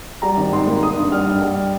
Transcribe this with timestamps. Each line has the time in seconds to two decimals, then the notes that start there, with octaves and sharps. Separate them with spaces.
0.22 G3 A#5
0.37 G#1
0.52 G#2 C6
0.67 A#3
0.83 A#3 D#6
0.98 G2
1.12 G3 F6
1.27 G2
1.41 G3